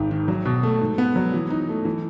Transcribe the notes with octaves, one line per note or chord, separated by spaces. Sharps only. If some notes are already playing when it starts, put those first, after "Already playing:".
Already playing: G#1 G#2
D#3
F#3
B2
A3
G#2
B3
F#3
E3
D#4
A3
E3